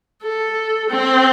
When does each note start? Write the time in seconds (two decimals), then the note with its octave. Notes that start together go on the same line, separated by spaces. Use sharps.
0.22 A4
0.89 C4